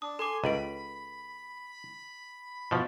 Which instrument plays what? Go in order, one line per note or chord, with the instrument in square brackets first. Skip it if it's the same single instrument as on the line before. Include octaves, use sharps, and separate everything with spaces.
[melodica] D4 [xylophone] D#6
[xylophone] A4 D6 [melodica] G#5 C6
[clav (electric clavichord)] C#2 [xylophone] G#4 B4 D7 [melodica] B5
[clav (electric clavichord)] B2 F3